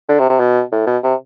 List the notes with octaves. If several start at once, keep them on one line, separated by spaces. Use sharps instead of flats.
D3
C3
C3
B2
A2
B2
C3